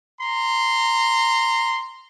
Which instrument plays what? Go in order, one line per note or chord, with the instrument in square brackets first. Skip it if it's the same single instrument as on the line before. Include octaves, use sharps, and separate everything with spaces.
[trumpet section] A#5 C6